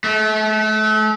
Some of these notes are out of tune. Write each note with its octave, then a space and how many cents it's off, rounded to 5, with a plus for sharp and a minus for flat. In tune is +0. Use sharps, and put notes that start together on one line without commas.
A3 -35